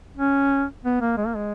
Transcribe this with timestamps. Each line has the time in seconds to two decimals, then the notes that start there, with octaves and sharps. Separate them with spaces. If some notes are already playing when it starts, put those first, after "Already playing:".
0.17 C#4
0.85 B3
1.01 A#3
1.17 G#3
1.27 A#3
1.36 G#3